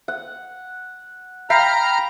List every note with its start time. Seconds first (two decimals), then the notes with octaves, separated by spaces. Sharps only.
0.08 F#5
1.50 F5 G5 A#5 B5 F6